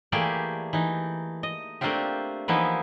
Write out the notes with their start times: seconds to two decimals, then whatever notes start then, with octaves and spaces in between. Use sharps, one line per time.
0.12 E3 A3 A#3 G4 G#4 D5
0.73 E3 D#4
1.43 D#5
1.81 A3 A#3 C4 D4 F4 G4
2.48 E3 F3 A#3 B3 D#4 E4